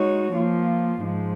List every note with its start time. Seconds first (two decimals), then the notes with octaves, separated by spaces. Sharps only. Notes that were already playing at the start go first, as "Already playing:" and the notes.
Already playing: G#3 D#4 F#4 C#5
0.33 F3 A#3 F4
1.00 G#2 F3 G#3